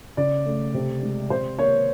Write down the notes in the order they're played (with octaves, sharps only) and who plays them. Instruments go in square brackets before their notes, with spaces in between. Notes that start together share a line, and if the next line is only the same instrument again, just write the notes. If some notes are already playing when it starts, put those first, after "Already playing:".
[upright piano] C#3 D5
A3
C3
G#3
C3 C5
A#3 C#5